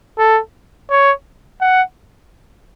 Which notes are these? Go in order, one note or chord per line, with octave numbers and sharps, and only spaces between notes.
A4
C#5
F#5